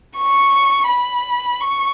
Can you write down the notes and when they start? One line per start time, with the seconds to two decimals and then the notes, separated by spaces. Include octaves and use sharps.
0.17 C#6
0.88 B5
1.60 C#6